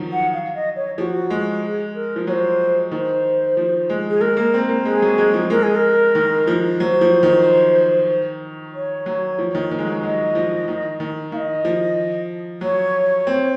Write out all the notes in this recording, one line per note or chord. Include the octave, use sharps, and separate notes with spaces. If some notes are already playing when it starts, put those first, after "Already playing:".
Already playing: D#3 F3 F#3
F#5
F5
D#5
C#5
F3 F#4 G#4
G#3
G#4
A#4
F3
F#3 C5 C#5
D#3 C5
F3
G#3
G#4
G#3 A#4
A#3
C4
A#3
G#3 G#4
F#3
G#3
F3
G#3 A#4
G#4
A#4
D#3
F3
F#3 C5
F3
D#3
C#5
F#3
F3
D#3
D#3
G#3
F#3
F#3 D#5
F3
D#3
D#3
D#3 F5
D#5
F3
F#3 C#5
C4